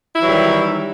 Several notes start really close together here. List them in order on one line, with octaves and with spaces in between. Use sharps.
E4 E3 F#3 G3 D#3